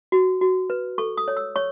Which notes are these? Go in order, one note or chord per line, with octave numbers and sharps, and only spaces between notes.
F#4
F#4
B4
A4 C#6
D#6
C#5
E6
C#5 C#6